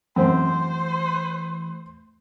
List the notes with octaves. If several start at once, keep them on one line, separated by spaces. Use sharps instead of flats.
F#2 E3 A3 C4 C5